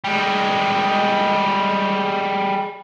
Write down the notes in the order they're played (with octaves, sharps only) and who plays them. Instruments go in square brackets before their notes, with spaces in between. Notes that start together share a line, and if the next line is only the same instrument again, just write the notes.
[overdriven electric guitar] G3 G#3